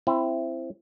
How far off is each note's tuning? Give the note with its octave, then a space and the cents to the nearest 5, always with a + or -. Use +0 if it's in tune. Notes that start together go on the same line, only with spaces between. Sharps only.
C4 +0 E4 +20